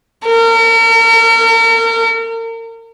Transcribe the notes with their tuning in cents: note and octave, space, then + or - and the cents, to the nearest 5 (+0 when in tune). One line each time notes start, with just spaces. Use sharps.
A#4 -40